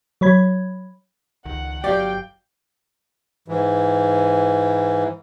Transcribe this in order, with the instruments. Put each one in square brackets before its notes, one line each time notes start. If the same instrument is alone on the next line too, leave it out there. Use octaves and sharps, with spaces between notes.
[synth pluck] F#3 C#5 B5 G#6
[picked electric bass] C#2 D#3 [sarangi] F#5
[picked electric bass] G1 F#3 [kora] G4 F5 [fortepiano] D5 [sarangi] G5
[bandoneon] G#2 E3